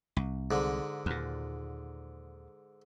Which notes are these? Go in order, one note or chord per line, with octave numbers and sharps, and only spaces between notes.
C2
G#2 D3
D#2 A#2